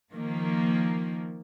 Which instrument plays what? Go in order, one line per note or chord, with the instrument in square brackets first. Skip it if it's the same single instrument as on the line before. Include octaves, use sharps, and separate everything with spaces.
[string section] D#3 F3 A#3